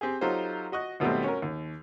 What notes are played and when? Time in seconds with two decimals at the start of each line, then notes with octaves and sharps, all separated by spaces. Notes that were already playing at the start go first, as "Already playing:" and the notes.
0.01 C4 G4 G#4
0.21 F#3 D#4 F4 G4 A4 C5
0.72 F#4 D#5 C#6 F#6
1.00 D#2 B2 F#3 G3 A3 C4
1.24 C#4 F#4 A#4
1.42 D#2